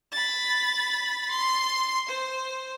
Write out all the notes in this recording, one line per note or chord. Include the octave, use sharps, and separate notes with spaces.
B5 A6
C6
C5